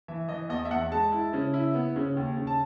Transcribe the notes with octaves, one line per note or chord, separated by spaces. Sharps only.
E3 E5
E3 D#5
E2 D#5
E5
E2 F#5
G#3 A5
E4
C#3
E4
B3
C#3
D#2
C#3
A5